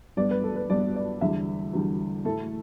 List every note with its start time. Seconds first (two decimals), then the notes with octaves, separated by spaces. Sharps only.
0.17 G2 G3 B3 D5
0.31 B4
0.44 A4
0.56 B4
0.70 G2 G3 B3 D5
0.96 D5
1.21 E2 D3 G3 E5
1.73 E2 D3 G3
2.25 A2 A3 A4